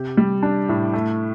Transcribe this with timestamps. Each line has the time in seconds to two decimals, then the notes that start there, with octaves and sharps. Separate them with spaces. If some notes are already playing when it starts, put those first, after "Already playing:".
Already playing: C3 G4
0.17 G3
0.43 D4
0.69 A2
0.93 A3